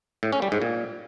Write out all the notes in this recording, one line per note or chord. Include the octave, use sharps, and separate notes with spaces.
A2
C#4
G3
G#2
A#2